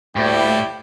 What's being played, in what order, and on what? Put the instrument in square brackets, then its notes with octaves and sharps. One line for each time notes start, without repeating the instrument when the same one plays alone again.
[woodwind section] D2 A3 A#3 [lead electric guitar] A2 [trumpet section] G3 E4 G5